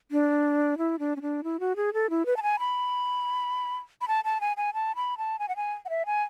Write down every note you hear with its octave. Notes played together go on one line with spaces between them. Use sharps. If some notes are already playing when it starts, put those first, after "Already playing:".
D4
E4
D4
C#4
D4
E4
F#4
G#4
A4
E4
B4
A5
G#5
B5
B5
A5
A5
G#5
G#5
A5
B5
A5
G#5
F#5
G#5
F#5
E5
G#5